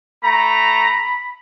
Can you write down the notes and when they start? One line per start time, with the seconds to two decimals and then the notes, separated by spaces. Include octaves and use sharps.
0.24 A3 A#5 B5